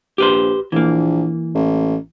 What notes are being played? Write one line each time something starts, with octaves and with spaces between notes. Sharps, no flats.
A#1 G4 B4 C5
A#1 E3 A#3
A1